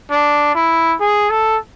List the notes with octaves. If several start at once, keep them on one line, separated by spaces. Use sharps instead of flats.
D4
E4
G#4
A4